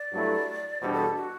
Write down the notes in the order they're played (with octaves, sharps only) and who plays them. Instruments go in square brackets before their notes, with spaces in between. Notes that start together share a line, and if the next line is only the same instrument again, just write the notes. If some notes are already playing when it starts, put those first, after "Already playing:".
Already playing: [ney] D5
[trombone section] G2 F#3 A3 E4
[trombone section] E2 B2 G3 D4 [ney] C5
[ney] A4
F#4